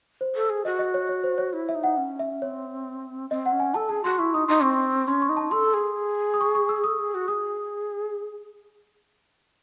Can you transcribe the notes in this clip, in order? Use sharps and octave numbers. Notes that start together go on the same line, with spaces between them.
C5
A4
G#4
F#4 D#5
D#5
C#5
C#5
C5
C#5
E4
E5
D#4
F#5
C#4
E5
C4 C#5
C4 D#5
F#5
C#4
G#5
A4 A5
G#4 A5
F#4 C6
E4 C#6
D#4 D#6
D#4 C6
C4 C#6
C#4 C6
C#6
D#4
A5
A4 C6
G#4
D#6
C#6
C#6
E6
A4 D#6
G#4
F#4
G#4 D#6